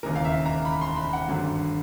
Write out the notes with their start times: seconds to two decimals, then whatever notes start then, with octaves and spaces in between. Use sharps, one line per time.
0.03 E1 D#2 C#3 E3 A#4
0.16 F5
0.25 E5
0.46 A#5
0.65 B5
0.81 C6
0.96 B5
1.13 F#5
1.28 G#1 G2 D3 F#3